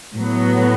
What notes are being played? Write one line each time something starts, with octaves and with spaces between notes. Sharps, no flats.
A2 F#3 B3